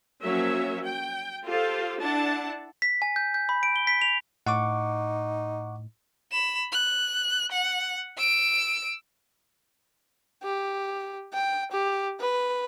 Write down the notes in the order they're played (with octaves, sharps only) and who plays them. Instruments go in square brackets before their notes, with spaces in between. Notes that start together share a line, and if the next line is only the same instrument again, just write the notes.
[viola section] F3 F#3 A#3 C#4 C#5 E5
G5
F4 G4 A4 C5 F5
D4 E4 F#5 A5
[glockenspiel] B6
G#5
G6
G6
B5
D7
G7
B6
F7
[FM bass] A2 [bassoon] D#4 [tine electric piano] F#5 C#6 D6
[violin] B5 E7
F#6
F#5
E6 D7
[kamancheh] G4
G5
G4
B4